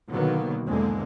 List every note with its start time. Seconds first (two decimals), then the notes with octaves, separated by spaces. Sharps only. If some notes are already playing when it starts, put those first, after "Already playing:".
0.10 B2 D3 D#3 F#3 A#3 B3
0.69 E2 G#2 D3 G#3 A#3 C4